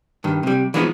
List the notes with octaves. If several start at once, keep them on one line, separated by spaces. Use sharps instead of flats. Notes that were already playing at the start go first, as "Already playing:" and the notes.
G2 D#3
C3 G3
E3 F3 G#3 B3 D#4